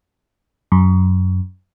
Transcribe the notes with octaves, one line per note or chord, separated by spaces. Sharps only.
F#2